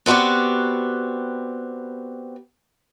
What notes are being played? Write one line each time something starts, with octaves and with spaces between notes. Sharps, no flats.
B3 C4 F#4 G4 D5